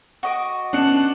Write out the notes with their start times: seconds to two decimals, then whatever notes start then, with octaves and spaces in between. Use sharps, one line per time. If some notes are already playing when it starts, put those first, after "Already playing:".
0.23 F#4 D#5 D6
0.73 B3 C#4 D4 A5 F#6 C#7